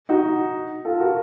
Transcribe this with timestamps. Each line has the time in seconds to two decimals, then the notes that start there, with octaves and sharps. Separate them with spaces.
0.09 D#4 F#4
0.85 F4 A4
1.00 F#4 A#4